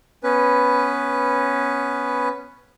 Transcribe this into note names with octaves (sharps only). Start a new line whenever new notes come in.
B3 C#4 B4